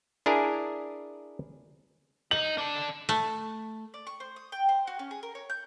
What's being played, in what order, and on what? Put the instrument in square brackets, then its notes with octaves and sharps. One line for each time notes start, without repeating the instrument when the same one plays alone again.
[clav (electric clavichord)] D4 E4 G#4 A#4 G#5
[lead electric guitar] D#4 [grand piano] F#7
[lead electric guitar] D4 A4
[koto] A3
[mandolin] D5
C#6
C5
D#6
G5
C5
F#4
C#4
G#4
A#4
C#5
G6